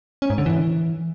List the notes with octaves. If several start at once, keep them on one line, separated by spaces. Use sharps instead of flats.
C#4
G#2
D3
E3